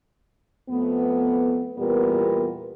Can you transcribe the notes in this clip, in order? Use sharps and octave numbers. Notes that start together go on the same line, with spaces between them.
F2 A3 B3
E2 A#2 G3 B3 A#4